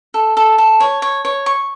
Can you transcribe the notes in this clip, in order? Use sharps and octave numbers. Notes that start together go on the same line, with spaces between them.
A4
A4
A4
C#5
C#5
C#5
C#6